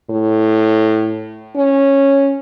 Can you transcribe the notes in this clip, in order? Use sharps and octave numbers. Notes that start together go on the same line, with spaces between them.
A2
C#4